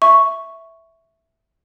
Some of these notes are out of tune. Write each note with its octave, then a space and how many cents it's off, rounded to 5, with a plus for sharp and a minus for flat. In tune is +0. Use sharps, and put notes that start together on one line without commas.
E5 +0 C#6 +0